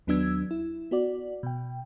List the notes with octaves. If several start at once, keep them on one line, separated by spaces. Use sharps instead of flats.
D#2 F#3 B3 D4 E6 G#6
E4
B3 F#4 D5
B2 G5